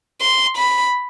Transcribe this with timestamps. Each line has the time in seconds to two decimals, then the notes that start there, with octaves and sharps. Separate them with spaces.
0.21 C6
0.57 B5